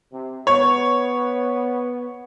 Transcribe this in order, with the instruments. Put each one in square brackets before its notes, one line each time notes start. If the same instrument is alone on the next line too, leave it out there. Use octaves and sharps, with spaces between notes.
[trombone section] C3
[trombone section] B3 [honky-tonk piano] C#5